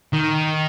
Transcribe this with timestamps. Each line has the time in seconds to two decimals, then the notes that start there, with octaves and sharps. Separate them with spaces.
0.13 D#3